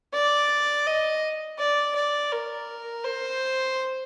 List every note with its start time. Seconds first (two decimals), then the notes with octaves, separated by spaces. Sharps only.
0.14 D5
0.87 D#5
1.59 D5
1.96 D5
2.32 A#4
3.04 C5